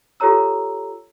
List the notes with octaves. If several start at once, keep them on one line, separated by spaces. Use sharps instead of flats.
F4 G4 A4 C#5 A#5 E6